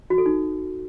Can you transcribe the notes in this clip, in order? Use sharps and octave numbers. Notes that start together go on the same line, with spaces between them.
F#4
A4
D#4